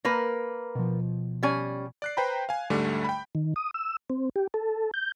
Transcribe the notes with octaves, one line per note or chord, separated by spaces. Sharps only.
A#3 A#4 B4
B2 F3
G3 C#4 G#5
D5 F#6 C7
B4 C5 G5 A#5 B5
F5 G#5
D2 G#2 D3 G3 A3
G5 B5
D#3
D#6
E6
C4
G4
A4
G6